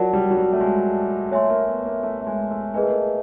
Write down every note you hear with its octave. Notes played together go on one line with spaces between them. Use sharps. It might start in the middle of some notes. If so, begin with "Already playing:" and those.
Already playing: F#3 F4 A#4 D5 F#5 A5
G3
F#3
G3
A3
G#3
A3 C#5 E5 G#5 C6
A#3
B3
A#3
A3
A3
G#3
A3
A#3 G#4 B4 D#5 G#5
A3
A#3